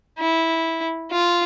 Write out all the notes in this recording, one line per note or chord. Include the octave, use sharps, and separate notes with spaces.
E4
F4